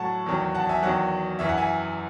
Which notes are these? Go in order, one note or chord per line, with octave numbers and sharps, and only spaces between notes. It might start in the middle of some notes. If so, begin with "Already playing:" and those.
Already playing: A2 F#3 F#5 A5 C#6
E2 D#3 F#3
F#5 A5
E5 G#5
E2 D#3 F#3 F#5
F#2 E3 E5
F#5
E5 G#5